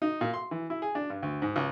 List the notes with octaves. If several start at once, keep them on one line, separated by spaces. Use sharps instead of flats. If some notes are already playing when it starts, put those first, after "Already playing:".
D#4
A#2
C6
E3
E4
G#4
D4
G2
D2
G#2
C#2